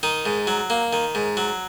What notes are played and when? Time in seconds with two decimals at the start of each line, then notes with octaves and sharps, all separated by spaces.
0.03 D#3 D#4
0.25 G#2
0.47 F#3
0.70 A#3
0.93 D#3
1.15 G#2
1.37 F#3